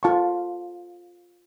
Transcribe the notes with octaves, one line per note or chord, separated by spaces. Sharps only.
F4 A4 F5 A5 C#6